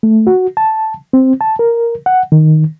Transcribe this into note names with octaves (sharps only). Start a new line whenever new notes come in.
A3
F#4
A5
C4
A5
A#4
F#5
D#3